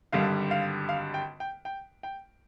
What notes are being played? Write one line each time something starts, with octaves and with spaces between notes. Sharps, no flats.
G#1 G2 D3 G3 F5
F5
F5
G5
G5
G5
G5